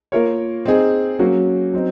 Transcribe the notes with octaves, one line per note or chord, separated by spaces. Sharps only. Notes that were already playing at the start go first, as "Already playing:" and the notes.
A#3 F4 A#4 C#5
C4 D#4 G#4
F#3 A#3 C#4 F#4
F#3 C4 D#4